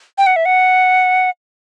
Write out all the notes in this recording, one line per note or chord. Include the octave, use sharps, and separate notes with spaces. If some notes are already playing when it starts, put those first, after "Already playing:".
G5
F#5
E5
F#5